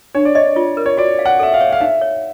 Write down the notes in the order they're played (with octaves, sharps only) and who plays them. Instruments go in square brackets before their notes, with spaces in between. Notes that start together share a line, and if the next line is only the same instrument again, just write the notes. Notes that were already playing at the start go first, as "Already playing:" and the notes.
[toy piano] D4 [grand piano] C#5
[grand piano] D5
[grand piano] C#5 [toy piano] D#5
[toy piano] F4
A#4
[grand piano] C#5
[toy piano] F#4 [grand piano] D5
[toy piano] F5
[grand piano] F#5
[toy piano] A4 [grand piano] E5
[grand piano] F5
[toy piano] C#5
[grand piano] F5
[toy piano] D#4 [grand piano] E5
[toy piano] C#5